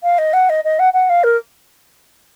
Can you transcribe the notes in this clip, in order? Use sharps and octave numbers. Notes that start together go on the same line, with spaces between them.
F5
D#5
F#5
D#5
D#5
F#5
F#5
F5
A#4